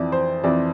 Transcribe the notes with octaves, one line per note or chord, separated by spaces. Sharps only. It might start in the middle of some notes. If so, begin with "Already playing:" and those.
Already playing: F2 E3 D5
C5
F2 E3 D5